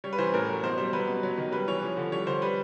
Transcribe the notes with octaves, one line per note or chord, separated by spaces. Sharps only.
G3 C#5
B4
E3 C5
A2 A#4
F#3
B2 C5
G3 C5
F#3 B4
B2
F#3
D#3
G3 B4
E3 C#5
F3
D3
G3 C#5
D3 C5
G3 B4